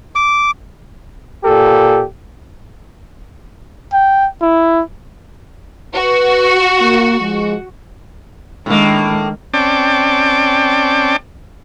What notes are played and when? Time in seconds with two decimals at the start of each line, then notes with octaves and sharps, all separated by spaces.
0.15 D6
1.44 A#2 G4 A4
3.93 G5
4.42 E4
5.94 F#4 B4
6.79 A#3
7.19 F3 G#3
8.66 A2 D#3 G#3 A#3 D4
9.54 C4 C#4 D5 G5 A5 D6